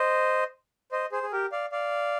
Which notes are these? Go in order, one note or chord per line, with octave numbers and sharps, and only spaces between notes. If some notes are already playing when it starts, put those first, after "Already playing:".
Already playing: C5 D#5
C5 D#5
G#4 C5
G#4
G4 A#4
D5 F5
D5 F5